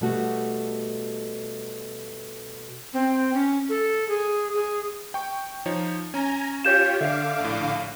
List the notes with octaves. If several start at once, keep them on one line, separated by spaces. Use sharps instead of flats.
B2 G3 A3 F#4
C4
C#4
A4
G#4
G#4
G5 C#6
F3 D#4 C#5
C#4 G#5 A#5
F4 G4 C#5 G6 E7
D3 E5 F5 D6
A#1 A2